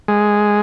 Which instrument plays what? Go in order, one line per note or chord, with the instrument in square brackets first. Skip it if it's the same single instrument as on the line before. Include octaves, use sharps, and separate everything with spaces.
[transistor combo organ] G#3